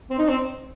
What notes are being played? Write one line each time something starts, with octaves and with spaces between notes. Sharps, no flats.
C4
D#4
C4